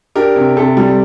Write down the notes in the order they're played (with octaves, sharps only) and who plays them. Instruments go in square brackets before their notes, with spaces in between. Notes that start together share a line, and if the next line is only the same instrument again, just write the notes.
[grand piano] D4 G4 A#4
C3
C3 A4
G3